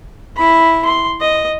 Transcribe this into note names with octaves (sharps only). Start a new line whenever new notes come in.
E4 B5
C6
D#5